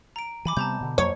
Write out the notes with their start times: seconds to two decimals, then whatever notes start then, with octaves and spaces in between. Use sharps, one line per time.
0.16 A#5 D7
0.45 E3 G#5 B5 D6
0.57 C3 G3 B3 A5 A#5 G6
0.81 B2 D3
0.98 F2 F#3 A#3 C#5